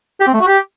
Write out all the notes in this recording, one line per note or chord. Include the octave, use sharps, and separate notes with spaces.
G4
C4
A3
F#4
G4